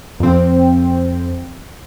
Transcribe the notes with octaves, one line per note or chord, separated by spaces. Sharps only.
F2 C4